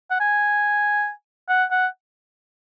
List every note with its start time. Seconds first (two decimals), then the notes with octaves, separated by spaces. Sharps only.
0.11 F#5
0.20 G#5
1.49 F#5
1.71 F#5